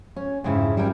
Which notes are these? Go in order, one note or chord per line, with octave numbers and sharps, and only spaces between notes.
C#4
F2 G#2 C#3 F3 E4
G3 E4 A#4 G5